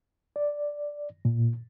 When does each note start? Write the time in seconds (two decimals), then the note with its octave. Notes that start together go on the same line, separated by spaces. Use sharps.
0.36 D5
1.25 A#2